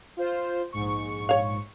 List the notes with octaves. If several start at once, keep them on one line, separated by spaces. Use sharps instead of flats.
F4 C5
A#1 G#2 C#6
C#5 F5